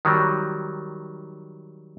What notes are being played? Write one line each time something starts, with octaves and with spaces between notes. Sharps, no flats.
D#3 F#3 G3